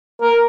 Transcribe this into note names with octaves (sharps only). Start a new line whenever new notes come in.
A#4